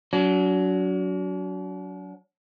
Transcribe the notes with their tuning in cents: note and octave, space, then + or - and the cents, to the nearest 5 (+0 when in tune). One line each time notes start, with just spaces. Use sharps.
F#3 +5 D4 -45